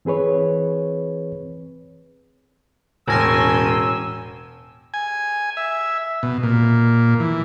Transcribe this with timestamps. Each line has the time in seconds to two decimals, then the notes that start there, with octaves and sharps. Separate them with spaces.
0.05 E3 C4 G#4 B4 C#5
3.08 E1 A2 C#4 G#5 C6 E6 A#6
4.94 G#5
5.57 E5
6.23 B2
6.43 A#2
7.20 E3